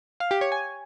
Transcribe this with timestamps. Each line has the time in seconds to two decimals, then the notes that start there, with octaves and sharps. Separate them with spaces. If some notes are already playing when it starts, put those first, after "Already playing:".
0.20 F5
0.31 G4
0.41 C#5
0.52 G#5